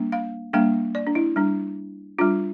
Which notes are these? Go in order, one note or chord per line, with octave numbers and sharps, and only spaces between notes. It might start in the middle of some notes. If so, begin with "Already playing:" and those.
Already playing: G3 A#3 D4
F5
G3 A#3 D4 F5
D5
D4
E4
G3 D4
G3 D4 F4